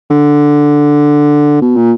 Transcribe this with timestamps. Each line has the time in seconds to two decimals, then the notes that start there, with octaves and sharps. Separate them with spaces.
0.10 D3
1.62 B2
1.76 A#2